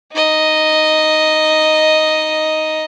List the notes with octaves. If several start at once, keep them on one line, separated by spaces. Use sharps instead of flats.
D#4 D#5